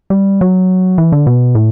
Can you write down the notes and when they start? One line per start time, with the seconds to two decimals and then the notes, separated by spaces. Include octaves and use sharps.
0.10 G3
0.41 F#3
0.98 E3
1.12 D3
1.27 B2
1.55 A2